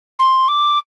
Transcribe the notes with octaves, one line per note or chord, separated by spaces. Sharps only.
C6
D6